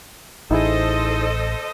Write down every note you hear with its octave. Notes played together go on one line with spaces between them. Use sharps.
A1 D#4 E4 G#4 A4 C5 D#5